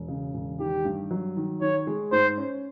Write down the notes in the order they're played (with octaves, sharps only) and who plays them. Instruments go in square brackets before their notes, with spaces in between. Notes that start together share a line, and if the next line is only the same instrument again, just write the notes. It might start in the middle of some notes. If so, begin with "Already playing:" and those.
Already playing: [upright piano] E1
C#3
E1
[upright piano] D#3 [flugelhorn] G4
[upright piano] G2
F#3
D#3
[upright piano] D#3 [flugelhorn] C#5
[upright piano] G#3
[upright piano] G#2 [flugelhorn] C5
[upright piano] C#4